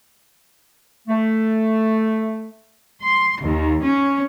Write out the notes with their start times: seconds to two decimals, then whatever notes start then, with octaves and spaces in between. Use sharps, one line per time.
1.08 A3
3.03 C6
3.42 D#2
3.83 C#4